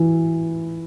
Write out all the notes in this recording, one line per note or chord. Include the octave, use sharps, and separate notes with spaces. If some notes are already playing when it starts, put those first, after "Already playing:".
Already playing: E3